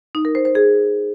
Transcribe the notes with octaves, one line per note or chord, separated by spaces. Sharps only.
D#4
A#4
C5
C5
G#4